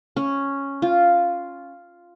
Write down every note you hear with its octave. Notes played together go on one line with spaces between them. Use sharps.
C#4
F4